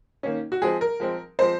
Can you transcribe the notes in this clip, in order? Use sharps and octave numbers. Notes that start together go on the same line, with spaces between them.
D#3 A#3 C#4
F#4
F3 G#3 C4 G#4
A#4
F3 G#3 C4
F3 G#3 C4 C5